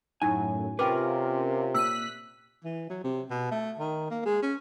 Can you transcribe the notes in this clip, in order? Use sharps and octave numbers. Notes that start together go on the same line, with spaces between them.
F#2 A2 F#3 D#4 G#5
C3 C#4 F4 A#4 B4 F5 G5 D6
A#2 E6 F#6 B6 D#7
E3
F#3
C3
B2
A3
D#3
A#3
G#3
C#4